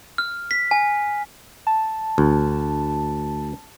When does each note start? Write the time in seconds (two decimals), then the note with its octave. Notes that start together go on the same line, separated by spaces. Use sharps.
0.18 F6
0.51 B6
0.71 G#5
1.67 A5
2.18 D2